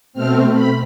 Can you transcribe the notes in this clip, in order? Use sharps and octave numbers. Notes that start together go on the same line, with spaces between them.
B2 A3 C4 F6
B5